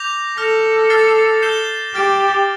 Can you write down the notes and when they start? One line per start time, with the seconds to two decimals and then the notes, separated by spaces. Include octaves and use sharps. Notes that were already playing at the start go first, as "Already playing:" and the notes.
Already playing: D6 G6 A#6 F7
0.37 A4 F6 A#6 F7
0.90 F6 A6 C7
1.42 G6 C7 E7 G7
1.94 G4 F6 A6 D7